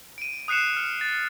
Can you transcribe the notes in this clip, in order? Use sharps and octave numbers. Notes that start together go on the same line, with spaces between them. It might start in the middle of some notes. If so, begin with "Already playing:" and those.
D7 D#7
D#6 F#6 C7 C#7 E7
F6 E7
A6